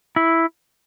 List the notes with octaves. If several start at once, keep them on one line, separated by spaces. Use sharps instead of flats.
E4